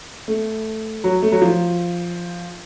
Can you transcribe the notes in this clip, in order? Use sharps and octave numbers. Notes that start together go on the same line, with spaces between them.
A3
F#3
A3
F#3
F3